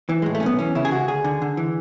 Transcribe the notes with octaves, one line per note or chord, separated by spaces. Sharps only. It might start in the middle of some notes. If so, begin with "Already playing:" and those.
E3
A2 G#3
A3
C#4
B1 B3
E3 C#4
C#3 E4
G#4
C#2 F#4
D2 G#4
D3
D3
E3